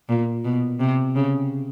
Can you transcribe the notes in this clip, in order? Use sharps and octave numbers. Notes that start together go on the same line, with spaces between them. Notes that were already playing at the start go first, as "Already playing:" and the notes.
A#2
B2
C3
C#3